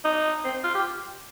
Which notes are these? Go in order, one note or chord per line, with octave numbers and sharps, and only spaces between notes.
D#4
C4
F4
G4